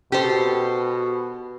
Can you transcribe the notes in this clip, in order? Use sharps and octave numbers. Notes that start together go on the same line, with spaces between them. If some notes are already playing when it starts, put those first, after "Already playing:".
B2 G4 A4 C5